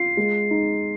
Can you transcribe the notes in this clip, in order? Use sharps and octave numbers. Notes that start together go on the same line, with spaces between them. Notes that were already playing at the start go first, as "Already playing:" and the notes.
Already playing: F4 C7
G#3
D#4